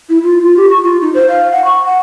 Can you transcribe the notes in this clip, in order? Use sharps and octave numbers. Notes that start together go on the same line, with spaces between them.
E4
F4
F4
G4
C#6
F4
D#4
C5
F5
F#5
C#6
F#5